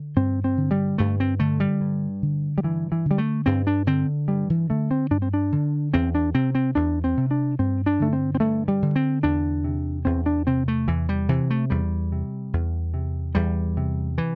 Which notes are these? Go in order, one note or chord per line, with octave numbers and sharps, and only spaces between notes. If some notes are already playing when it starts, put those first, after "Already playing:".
Already playing: D3
G2 C4
C4
D3
G3
G2 A3
C4
D3 A3
G3
G2
D3
G3
G2 E3
E3
D3
G3
A3
G2 C4
D4
D3 C4
G2 G3
E3
D3 A3
C4
G2 D4
C4
D4
D3
E2 C4
D4
C3 C4
C4
E2 D4
C4
C3
D4
G2 C4
D4
D3 A3
C4
C4
G2 A3
G3
D3
C4
E2 D4
C3
E2 C4
D4
C3 C4
A3
E2 E3
G3
C3 E3
A3
E2 G3
C3
E2
C3
E2 G3
C3
E3